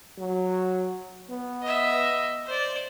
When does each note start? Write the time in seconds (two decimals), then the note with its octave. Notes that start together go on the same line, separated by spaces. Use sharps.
0.18 F#3
1.30 B3
1.62 D#5 E5
2.46 C5 D5